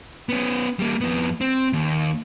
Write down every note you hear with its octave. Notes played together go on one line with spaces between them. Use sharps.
B3 C#4
G3 A#3
F2 B3
C4
D#2